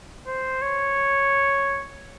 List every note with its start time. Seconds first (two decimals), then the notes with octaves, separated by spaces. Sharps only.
0.27 C5
0.62 C#5